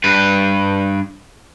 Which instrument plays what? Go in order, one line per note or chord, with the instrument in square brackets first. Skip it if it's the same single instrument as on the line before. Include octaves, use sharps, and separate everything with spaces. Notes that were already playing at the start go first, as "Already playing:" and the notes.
[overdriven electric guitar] G2 B4